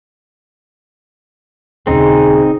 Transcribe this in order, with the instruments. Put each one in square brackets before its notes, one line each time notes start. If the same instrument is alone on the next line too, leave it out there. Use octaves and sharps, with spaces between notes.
[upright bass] D#1 C#3 [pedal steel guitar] C4 D#4 [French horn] G#4